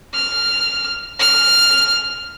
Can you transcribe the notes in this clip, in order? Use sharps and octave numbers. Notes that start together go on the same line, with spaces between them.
F6
F6